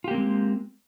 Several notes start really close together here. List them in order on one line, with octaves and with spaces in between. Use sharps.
F4 G4 A#3 C4 G#3